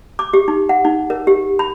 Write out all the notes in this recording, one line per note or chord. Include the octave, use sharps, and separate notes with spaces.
D6
G4
D#4
F#5
D#4
A#4
G4
B5